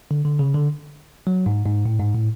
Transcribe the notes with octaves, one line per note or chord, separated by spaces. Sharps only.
D3
D3
C#3
D3
F#3
G#2
G#2
A2
G#2
A2